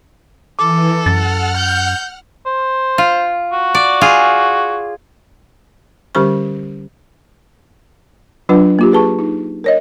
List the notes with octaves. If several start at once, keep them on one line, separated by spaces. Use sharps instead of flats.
E3 A4 D6
F#2 F#5 F6 A6
G6
C5
F4
F#4
D5
F4 G#4
D3 G3 C#4 G4 C5 C#6
F#3 D4 F4 B4 F#5
A#3 F4 G4
G#4 B4 A5 C#6
D#4
A#4 C#5 D#5